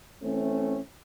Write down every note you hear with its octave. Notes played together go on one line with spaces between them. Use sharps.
E3 A3 C4 C#4